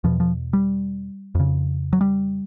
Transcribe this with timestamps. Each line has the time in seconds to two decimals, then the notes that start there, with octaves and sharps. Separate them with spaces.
0.04 E2 B2 F3
0.20 F3
0.53 G3
1.35 F2 C#3
1.93 F#3
2.01 G3